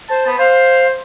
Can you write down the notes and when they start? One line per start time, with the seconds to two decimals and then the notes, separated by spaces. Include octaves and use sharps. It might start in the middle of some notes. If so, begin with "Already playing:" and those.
0.09 C5 A5
0.26 B3
0.38 C5 F5